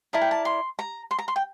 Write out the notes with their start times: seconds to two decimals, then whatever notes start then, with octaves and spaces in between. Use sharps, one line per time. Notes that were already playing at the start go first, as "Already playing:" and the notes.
0.13 E4 A#4 D5 A5
0.22 G5
0.31 A5
0.45 C6
0.79 A#5
1.11 C6
1.18 A#5
1.28 C6
1.36 G5